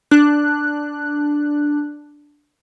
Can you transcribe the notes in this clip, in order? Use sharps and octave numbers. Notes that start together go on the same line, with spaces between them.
D4 F#6